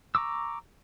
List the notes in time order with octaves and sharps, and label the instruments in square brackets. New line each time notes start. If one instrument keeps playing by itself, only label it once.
[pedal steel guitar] A#5 C#6 D6 E6